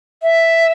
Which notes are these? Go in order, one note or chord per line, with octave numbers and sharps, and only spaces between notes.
E5